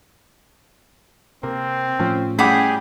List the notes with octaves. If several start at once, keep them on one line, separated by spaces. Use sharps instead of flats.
C3 A#3 C4
A2 F3 C#4
A2 G3 C#4 G4 G#4 F#5 B5